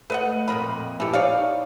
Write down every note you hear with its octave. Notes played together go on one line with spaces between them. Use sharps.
A3 B4 D#5 F#5
F2 A#2 A#4 D#5 B5
F2 A#2 E3 G4 A4
D#4 C#5 D5 F5